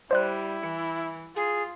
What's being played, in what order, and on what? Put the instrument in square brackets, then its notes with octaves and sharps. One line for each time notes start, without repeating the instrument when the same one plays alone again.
[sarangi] G3 [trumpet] E4 [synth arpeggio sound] C5 D5 F#6
[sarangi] E3 [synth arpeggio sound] C#7
[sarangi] F4 [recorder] G#4